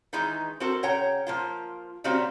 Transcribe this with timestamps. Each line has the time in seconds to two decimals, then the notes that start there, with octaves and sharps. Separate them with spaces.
0.13 D#3 E3 G#3 D#4
0.60 C4 F#4 A4 A#4
0.83 C#3 C#5 F#5 G5 A#5
1.27 F3 A#3 F4
2.04 C#3 G3 A#3 C4 F#4 F5